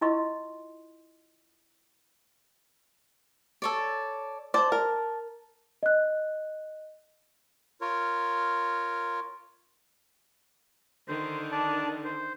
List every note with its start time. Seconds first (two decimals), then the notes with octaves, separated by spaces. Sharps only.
0.01 E4 F4 D#5 C6 C#6
3.62 A4 C#5 D5
4.54 C5 D5 A5
4.72 A#4
5.83 D#5 F#6
7.81 F4 A#4 C#5
11.08 D3 D#3 C5
11.52 D4 D5 A5
12.04 C5